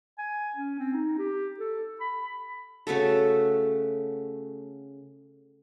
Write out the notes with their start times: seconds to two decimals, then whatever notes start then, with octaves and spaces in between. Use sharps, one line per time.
0.18 G#5
0.56 C#4
0.79 C4
0.93 D#4
1.18 G4
1.59 A4
2.00 B5
2.87 C#3 A3 F#4 A4